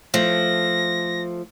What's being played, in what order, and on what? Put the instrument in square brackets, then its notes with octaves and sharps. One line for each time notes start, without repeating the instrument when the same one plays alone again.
[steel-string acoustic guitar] F3 A3 [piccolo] A#6